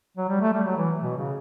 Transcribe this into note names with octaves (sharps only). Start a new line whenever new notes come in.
F#3
G3
A3
G3
F#3
E3
B2
C#3